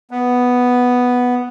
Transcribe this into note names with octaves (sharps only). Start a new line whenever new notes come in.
B3